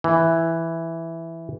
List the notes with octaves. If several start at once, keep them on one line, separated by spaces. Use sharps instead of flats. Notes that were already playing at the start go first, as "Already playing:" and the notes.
E3